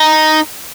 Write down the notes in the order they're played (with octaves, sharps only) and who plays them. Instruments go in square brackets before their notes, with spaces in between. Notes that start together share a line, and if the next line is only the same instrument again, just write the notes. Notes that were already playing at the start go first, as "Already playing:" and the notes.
Already playing: [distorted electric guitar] D#4